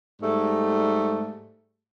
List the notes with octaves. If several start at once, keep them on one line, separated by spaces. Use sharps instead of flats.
G#2 G3 A3